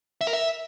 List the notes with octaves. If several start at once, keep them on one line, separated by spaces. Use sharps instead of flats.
E5
A#4
E5